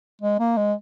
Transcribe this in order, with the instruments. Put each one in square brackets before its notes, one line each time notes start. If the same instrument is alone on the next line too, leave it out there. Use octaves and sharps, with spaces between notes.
[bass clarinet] G#3
A#3
G#3